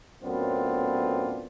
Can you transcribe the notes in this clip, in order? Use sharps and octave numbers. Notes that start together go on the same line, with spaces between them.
F#2 A2 B3 C4 D4 F4